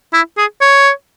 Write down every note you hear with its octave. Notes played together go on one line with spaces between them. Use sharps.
E4
G#4
C#5